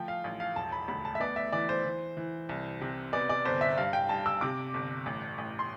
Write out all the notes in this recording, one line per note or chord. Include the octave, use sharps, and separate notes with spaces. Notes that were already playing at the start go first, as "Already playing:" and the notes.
Already playing: F3 A3 G5
F5
A1
F5
E1 A5
B5
D2 B5
A5
E5
B3 D5
E5
E3 D5
C5
E3
E3
C2
C3
B3 D5
D5
G1 C5
E5
G2 F5
G5
G2 A5
E6
C3 D6
G1
A1
A1
C6